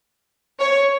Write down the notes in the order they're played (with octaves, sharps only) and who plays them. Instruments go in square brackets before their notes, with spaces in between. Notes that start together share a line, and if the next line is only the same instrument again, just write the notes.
[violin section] C#5